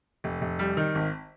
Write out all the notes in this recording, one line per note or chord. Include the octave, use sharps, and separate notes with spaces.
F1
F1
G3
D#3
G#1